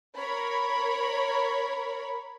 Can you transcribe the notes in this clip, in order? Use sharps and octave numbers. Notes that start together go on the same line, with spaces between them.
A#4 C#5 B5